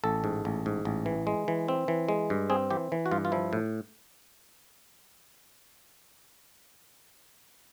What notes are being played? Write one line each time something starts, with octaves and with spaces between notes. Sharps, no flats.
A1 A4
G#2
A1
G#2
A1
E3
G#3
E3
C4
E3
G#3
G2
C4 G#4
E3 G4
E3
F#4
G2 F4
F4
F3 E4
A2